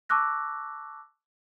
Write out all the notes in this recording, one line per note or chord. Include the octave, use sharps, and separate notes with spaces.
A5 C#6 D6 E6 F#6 A#6